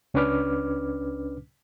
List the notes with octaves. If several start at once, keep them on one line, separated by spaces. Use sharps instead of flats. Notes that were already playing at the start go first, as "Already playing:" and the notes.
C#2 C#4 D4 B4 D6 F6